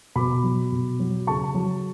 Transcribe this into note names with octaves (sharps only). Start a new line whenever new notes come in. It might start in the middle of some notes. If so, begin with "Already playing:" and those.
B2 B5 D6
F#3
B2
F#3
C#3 A5 C#6
F#3